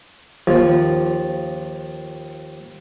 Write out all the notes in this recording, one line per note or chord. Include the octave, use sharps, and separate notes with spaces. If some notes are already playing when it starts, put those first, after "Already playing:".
D#2 F3